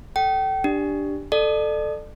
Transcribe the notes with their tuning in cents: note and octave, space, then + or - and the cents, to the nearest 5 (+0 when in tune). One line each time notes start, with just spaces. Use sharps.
A4 -5 G5 -35
D4 +0 G4 +0
A4 +0 D5 +35